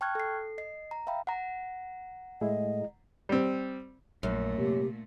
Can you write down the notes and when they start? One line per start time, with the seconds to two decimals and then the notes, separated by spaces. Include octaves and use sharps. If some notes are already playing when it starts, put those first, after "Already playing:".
0.01 G5 A5 C#6 F6 F#6 G#6
0.15 A4 C7
0.58 D#5 C7
0.91 A#5
1.07 E5 F5 G5 B5
1.27 F#5 A#5
2.41 A2 G#3 E4 G#4 D#5
3.29 G3 C4
4.23 A#1 F#2 A#2 A3
4.58 C3 A#3 G4